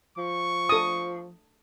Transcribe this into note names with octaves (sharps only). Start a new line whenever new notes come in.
F3 C#6
A4 D#6